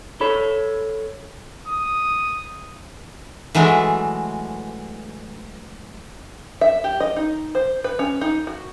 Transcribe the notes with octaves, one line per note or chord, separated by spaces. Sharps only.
A4 C#5 B5
D#6
E3 F#3 G#3 A3
E5
G4
D#5
D#4
C5
B4
C#4
D#4
F#4